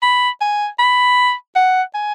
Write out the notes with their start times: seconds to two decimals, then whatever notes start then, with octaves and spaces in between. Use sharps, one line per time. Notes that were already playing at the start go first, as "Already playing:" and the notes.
0.02 B5
0.41 G#5
0.79 B5
1.56 F#5
1.94 G#5